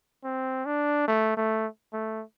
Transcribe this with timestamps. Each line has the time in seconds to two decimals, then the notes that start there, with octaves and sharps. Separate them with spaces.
0.24 C4
0.66 D4
1.08 A3
1.37 A3
1.93 A3